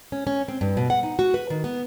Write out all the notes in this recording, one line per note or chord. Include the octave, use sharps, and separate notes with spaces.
C#4
C#4
C4
G2
B2
F#5
D#4
F#4
B4
D#3
B3